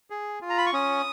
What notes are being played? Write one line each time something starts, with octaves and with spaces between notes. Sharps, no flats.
G#4
F4
A#5
B5
C#6
C#4 D#6